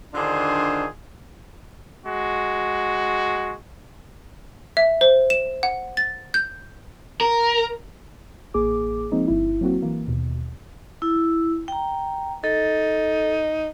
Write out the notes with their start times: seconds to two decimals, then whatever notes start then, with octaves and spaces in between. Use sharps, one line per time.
0.14 D3 D#3 D4 F4 G#4 C5
2.06 G#3 F#4
4.77 E5
5.01 C5
5.30 E7
5.63 F#5
5.97 A6
6.34 G6
7.21 A#4
8.54 A1 A#3 G#4 D6
9.11 F3 G#3 A#3 C4 D#4
9.28 G1 E4
9.61 F#3 A#3 C4 F#4
9.82 E3 A#3
10.08 D#2 B2
11.02 E4
11.68 G5 A#5
12.44 D#4 A4